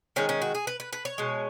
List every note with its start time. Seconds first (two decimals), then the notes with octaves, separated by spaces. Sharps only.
0.16 D#3 G#3 C#4
0.29 C#4
0.42 F#4
0.55 G#4
0.67 B4
0.80 B4
0.93 B4
1.05 C#5
1.18 B2 G#3